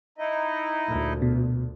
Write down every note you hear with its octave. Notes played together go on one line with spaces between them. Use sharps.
D#4 E4 D#5
D2 A#2
B2